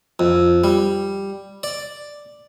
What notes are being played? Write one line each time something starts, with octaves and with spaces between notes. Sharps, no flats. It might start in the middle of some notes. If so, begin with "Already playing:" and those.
F2
G3
D5